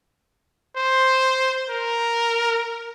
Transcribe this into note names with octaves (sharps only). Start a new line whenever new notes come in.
C5
A#4